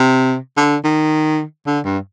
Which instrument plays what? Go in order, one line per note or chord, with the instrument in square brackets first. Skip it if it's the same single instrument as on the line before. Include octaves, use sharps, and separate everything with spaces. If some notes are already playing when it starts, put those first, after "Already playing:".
Already playing: [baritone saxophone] C3
D3
D#3
D3
G2